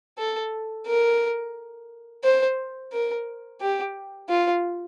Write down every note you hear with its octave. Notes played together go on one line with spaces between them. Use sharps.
A4
A#4
C5
A#4
G4
F4